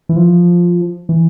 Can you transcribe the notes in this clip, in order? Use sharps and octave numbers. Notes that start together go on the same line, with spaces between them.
E3
F3
E3